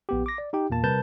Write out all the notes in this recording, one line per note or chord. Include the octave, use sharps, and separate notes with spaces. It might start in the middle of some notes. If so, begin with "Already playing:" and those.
A#1 B3 G4
D6 A#6
D5
D#4 G4 G5
E2 A#2 A#3 A5
C3 G3 A#4 B4 A5 G6